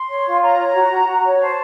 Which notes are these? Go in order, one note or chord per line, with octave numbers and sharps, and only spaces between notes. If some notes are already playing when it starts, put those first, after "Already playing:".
Already playing: C6
C#5
F4
C#5 A#5
C#5
F#4
F#4
F#4
C#5
C5 A5